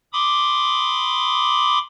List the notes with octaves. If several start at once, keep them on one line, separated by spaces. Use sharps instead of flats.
B5 C6 D6 D#6